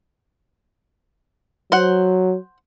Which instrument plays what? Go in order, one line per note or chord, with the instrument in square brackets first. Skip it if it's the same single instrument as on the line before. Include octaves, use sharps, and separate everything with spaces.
[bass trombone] F#3 [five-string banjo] C5 F#5